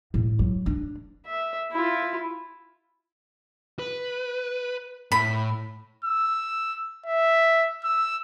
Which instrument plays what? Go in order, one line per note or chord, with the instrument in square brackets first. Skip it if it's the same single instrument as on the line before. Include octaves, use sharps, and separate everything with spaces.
[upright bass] A2
F#3
D4
[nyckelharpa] E5
E4 F4
[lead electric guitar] B4
[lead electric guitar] A2 [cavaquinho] B5
[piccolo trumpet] E6
E5
E6